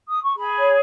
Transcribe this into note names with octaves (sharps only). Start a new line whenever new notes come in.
D#6
C#6
G#4 B5
C#5